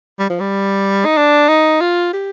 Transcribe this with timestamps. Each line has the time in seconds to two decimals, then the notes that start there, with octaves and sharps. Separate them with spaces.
0.19 G3
0.30 F3
0.40 G3
1.05 D#4
1.17 D4
1.49 D#4
1.81 F4
2.13 G4